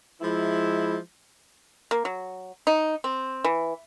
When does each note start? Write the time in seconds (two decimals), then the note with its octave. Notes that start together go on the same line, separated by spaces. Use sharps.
0.21 F3 G#3 E4
1.91 A#3
2.05 F#3
2.67 D#4
3.04 C4
3.44 E3